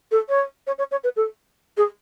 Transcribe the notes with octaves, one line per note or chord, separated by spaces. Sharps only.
A4
C#5
C#5
C#5
C#5
B4
A4
G#4